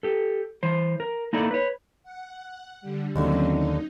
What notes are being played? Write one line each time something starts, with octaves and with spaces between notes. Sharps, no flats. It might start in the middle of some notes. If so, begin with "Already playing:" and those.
G4 A4
E3 C5
A#4
A#3 D#4 E4 A4 D5
B4 C#5
F#5
D3 G3
D#2 D3 F#3 C4 C#4
D#4